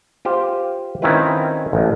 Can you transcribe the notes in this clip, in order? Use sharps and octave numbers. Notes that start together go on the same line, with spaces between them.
F4 G4 C5 F5
D#3 C4 C#4 E4 F4 B4
A1